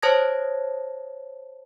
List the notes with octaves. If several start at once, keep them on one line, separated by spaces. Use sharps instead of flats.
C5 C#5 A5 D#6 G#6 A#6